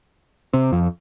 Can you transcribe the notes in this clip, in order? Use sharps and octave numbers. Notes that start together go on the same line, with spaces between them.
C3 C4
F2 F3